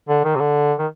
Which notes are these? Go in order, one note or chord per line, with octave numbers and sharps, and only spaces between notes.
D3
D#3
C3
D3
D#3